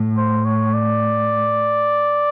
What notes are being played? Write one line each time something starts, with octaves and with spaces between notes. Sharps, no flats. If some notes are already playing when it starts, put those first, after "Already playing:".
Already playing: A2
C5
C#5
D5